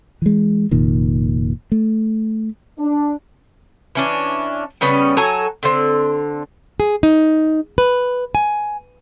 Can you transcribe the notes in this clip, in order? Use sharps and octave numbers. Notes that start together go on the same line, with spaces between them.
E3 G#3
F1 A#2 D#3
A3
D4
E3 C#4 D4
C#3 G3 B3 C#4
F#3 A4 G#5 A#5
D3 C4
G#4
D#4
B4
G#5